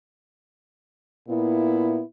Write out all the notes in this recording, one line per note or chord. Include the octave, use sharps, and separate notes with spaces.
A#2 B3 E4